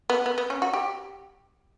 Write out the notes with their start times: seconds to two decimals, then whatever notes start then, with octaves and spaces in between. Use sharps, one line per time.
0.10 B3
0.26 B3
0.38 B3
0.50 C#4
0.62 F#4
0.73 G4